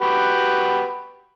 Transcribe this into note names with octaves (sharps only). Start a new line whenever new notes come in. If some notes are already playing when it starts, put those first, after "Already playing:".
F#4 G4 B4